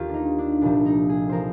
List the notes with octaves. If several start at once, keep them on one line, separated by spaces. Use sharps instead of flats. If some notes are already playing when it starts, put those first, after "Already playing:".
Already playing: D#2 D#3 F4 G4
D4 D#4
D4
C2 A#2 F3 D4
D#4
G#4
F3 A#4 C5